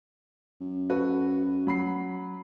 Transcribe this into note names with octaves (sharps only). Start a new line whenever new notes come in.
F#2
F#4 A4 B4
F#3 B5 C7